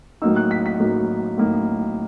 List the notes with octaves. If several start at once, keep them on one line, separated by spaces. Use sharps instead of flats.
A2 F#3 A#3 D#4 E6
F#6
B6
B6
A2 F#3 A#3 D#4
A2 F#3 A#3 D#4